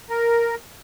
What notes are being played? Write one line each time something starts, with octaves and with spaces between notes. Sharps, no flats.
A#4